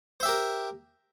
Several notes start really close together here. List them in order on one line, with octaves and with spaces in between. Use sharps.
C5 E5 G4 A#4